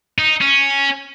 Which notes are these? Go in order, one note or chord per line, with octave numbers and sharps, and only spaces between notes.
D#4
C#4